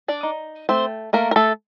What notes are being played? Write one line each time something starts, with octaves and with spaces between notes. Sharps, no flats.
D4 D5
D#4
A3 C4 C5
A3 A#3 A#4
A#4
A3 A4